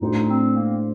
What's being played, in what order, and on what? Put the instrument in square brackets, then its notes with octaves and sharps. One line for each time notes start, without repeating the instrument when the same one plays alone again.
[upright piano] A2 A3 D4 F#4 C5 [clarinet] D#4
[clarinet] C4
A#3